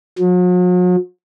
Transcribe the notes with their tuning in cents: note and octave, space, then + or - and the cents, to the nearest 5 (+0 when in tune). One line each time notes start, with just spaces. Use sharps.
F#3 -45